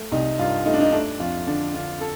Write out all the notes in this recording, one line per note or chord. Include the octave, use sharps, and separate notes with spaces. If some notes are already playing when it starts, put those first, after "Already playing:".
Already playing: A3
C2 D#4
G2 F4
A3 D#4
D4
D#4
A3 D4
F2 F4
D3 D4
D3 F4
A4